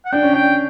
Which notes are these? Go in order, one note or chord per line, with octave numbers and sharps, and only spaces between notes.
F#5
D4 G5
C#4
D4 G5